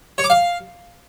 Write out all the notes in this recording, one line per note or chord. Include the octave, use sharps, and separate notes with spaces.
C#5
D6
F5